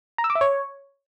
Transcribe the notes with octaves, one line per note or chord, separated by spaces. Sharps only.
A#5
E6
D6
E5
C#5